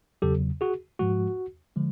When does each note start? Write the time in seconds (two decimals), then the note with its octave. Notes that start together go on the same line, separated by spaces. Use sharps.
0.22 E2 C#3 F#3 G4 A4
0.61 F#4 G#4
0.99 G#2 F3 G#3 F#4
1.76 D3 F3 G#3